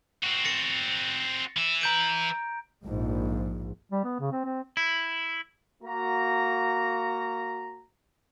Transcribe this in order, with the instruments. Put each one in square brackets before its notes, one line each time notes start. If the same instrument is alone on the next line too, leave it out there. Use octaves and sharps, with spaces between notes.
[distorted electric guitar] C4 F#4
[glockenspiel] A6 A#6 C#7
[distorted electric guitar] E3 E4
[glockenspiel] A#5 G6 D7
[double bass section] A#1 G#2
[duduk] G3
B3
C#3
C4
C4
[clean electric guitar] E4
[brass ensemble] A#3 F#4 A#5